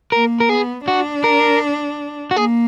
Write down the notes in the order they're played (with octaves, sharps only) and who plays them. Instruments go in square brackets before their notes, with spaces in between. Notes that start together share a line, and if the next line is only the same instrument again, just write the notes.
[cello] A#3 [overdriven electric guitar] A#4
[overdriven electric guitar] A#4
[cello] B3 [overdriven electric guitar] G#4
[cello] D4 [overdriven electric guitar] F#4
[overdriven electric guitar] A#4
F#4
[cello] A#3 [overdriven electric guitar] G#4